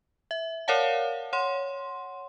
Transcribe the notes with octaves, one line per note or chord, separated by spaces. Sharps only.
E5
A#4 C#5 D5 F5 F#5 A5
C#5 F#5 C6